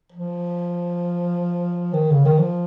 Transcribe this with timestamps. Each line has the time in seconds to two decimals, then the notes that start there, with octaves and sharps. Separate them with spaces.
0.12 F3
1.93 D#3
2.12 C#3
2.25 D#3
2.38 F3